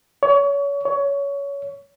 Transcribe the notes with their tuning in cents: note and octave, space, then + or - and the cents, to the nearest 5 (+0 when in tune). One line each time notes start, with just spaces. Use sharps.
C#5 +30
C#5 +20